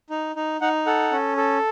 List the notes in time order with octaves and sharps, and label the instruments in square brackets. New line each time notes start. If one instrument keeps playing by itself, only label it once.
[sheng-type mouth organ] D#4
D#4
D#4 F#5
A4 F#5
C#4
A4